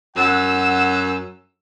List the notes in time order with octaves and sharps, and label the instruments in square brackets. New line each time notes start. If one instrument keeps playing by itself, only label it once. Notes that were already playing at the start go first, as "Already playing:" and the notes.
[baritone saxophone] F#2 [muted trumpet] F#5 [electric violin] E6